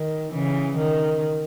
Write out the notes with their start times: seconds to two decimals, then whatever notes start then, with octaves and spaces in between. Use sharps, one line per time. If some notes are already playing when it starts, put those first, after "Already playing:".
Already playing: D#3
0.33 C#3 E3
0.77 D#3